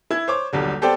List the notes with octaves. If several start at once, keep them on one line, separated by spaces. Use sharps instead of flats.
E4 G#6
C5 C#5 D6
D#1 B1 D3 G3
B3 G4 A4 C5 D5 G5